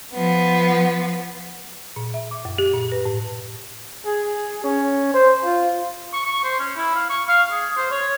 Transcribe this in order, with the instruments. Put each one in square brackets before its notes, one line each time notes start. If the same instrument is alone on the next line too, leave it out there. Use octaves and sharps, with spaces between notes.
[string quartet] F3 B3
[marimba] A#2
E5
D6
F#2
G4
A#2
B4
A2
[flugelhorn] G#4
C#4
C5
F4
[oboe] C#6
C#6
C5
C#4
E4
F5
C#6
F5
G#4
C5
C#5